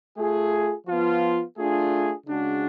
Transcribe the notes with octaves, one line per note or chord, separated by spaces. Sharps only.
A3 F4 G#4
F3 B3 F4
A3 D4 F4 G#4
C#3 G#3 D4 F#4